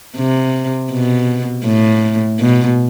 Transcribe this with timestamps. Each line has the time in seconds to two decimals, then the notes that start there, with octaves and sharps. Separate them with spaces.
0.17 C3
0.91 B2
1.65 A2
2.40 B2